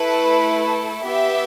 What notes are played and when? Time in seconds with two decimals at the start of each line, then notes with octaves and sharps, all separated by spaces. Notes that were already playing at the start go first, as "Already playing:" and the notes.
Already playing: A3 E4 A4 B4
1.02 B3 G4 E5